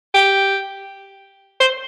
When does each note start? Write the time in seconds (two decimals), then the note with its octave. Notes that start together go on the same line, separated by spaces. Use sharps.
0.14 G4
1.60 C5